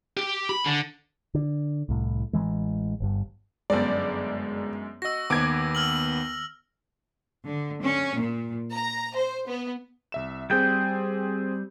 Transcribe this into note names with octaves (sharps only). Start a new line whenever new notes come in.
G4
B5
D3
D3
C2 A2
A1 D#3 E3 G#3
G1 G2
G1 F#2 G#3 D5
F#4 D#5 E6 A#6
D#2 B3 D6 G#6 D7
E6 F6 F#7
D3
C#4
A#2
A#5
C5
B3
C2 E5 E7
G3 C4 G#4 G5 G6